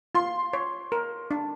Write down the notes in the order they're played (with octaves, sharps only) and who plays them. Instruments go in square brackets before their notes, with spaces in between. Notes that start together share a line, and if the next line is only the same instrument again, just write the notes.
[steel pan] F4 [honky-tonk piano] C6
[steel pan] C#5
A#4
D4